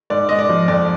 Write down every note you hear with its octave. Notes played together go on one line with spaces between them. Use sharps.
G#2 D5
G#2 D#5
D5
F3
F2 D5